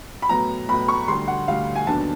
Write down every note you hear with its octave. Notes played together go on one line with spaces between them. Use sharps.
B5
A2 F#3 B3 A#5
A2 F#3 B3 B5
C#6
D2 D3 G3 C6
F#5
D2 D3 G3 F5
G#5
D#2 D3 F#3 B3 D4 A5